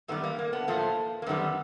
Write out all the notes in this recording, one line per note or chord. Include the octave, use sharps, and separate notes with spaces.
F#2 D#3 G3 A3 B3
A#3
A#3
A3 B3
A2 F3 A3 A#3
A#3
F#2 D#3 G3 A3 B3